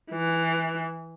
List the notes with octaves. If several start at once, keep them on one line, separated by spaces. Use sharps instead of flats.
E3